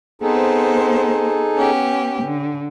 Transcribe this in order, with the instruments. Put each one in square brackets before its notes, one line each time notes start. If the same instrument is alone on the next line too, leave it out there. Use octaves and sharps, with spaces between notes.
[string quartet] B3 C4 C5 [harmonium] D#4 G#4 A4
[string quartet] B3 C#4 G4
D3